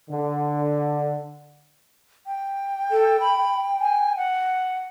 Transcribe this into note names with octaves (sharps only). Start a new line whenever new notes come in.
D3
G5
A4
B5
G#5
F#5